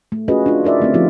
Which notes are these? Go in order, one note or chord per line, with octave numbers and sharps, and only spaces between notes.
A3
C#4 F4 F#4 G#4 B4 D#5
D4 F4
D#4 A#4 D5 E5
D3 A3 C4
F3 A3 B3 D#4 F4 G4